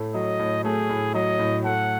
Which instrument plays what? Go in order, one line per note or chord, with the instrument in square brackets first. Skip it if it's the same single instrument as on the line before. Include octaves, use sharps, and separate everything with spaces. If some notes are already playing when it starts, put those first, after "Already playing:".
Already playing: [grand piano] A2 A3
[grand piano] F#3 [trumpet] D#5
[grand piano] A2
[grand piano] A3 [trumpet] G#4
[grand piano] A2
[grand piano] F#3 [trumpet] D#5
[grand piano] A2
[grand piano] A3 [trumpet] F#5